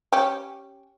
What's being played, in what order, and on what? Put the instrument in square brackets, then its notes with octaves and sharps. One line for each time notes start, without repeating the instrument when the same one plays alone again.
[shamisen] C#4 G4